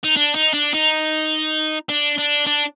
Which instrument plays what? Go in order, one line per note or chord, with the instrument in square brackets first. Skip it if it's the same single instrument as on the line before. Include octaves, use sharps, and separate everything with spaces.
[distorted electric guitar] D#4
D4
D#4
D4
D#4
D4
D4
D4